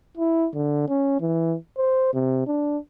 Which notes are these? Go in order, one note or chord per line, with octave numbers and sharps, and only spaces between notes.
E4
D3
C#4
E3
C5
C3
D4